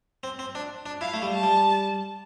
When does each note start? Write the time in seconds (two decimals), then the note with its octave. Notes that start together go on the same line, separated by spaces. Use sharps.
0.23 C4
0.39 C4
0.55 D4
0.86 D4
1.01 E4 F5
1.14 A3
1.22 G3
1.33 A5
1.43 G3